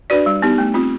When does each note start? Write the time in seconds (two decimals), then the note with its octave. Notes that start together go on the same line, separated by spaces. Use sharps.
0.10 D4 F#4 B4 D5
0.26 G3
0.42 B3 D#4 G4
0.58 A3
0.74 C4 F4